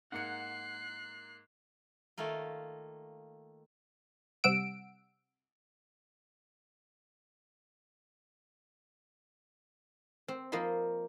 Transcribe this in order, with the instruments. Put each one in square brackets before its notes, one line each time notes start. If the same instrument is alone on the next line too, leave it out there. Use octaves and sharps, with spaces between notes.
[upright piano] G#2 A#3 C#7 [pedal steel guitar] F#5 [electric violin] F#6 C7
[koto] D#3 A3 A#3 F4
[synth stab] C3 G3 F#5 E6 D7
[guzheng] C4
F3 A#3 D#5 B5 C6